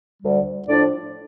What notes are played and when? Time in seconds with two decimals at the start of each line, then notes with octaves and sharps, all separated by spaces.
0.23 D2 D3 G3
0.68 A2 F3 D4 D5